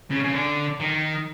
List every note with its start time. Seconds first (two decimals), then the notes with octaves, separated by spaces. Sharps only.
0.11 C#3
0.24 C#3
0.33 D3
0.80 D#3